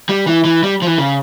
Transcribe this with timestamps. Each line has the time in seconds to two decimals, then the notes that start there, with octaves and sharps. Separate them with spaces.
0.09 G3
0.27 E3
0.45 E3
0.63 G3
0.82 F3
0.87 E3
0.98 C#3